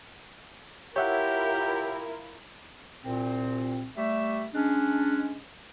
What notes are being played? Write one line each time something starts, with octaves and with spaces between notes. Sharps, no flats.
E4 F4 G4 A#4 C#5 E5 F#5
C2 A#2 C4
G3 A3 E5
G#3 C#4 D4